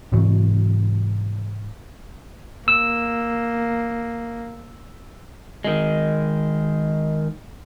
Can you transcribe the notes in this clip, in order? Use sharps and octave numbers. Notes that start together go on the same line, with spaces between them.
G#2 C3 E3 F#3
A#3 E6
D#3 G#3